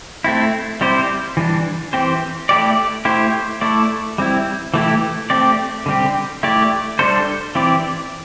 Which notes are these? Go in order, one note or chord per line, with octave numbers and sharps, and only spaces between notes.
A3 C4 E4
G3 C4 E4 G4 C5
E3 G3 D4
E3 C4 G4 C5
A3 E4 G4 D5
A3 E4 G4 C5
A3 E4 A4 D5
G3 C4 E4
E3 A3 E4 G4
A3 C4 G4 D5
D3 G3 C4 G4
A3 E4 G4 D5
G3 D4 A4 C5
E3 C4 E4 G4 D5